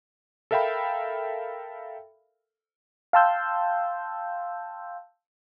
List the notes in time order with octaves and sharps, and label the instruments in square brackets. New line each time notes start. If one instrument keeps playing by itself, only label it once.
[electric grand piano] A4 A#4 E5 F5 G5 B5
[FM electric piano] F5 G5 A5 C6 E6 G6